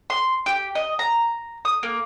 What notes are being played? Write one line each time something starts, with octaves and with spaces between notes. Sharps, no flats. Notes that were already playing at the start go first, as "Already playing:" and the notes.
C6
G4
D#5
A#5
D#6
A#3